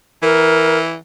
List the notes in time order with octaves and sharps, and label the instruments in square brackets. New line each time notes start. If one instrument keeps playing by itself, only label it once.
[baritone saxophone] E3 [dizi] A#4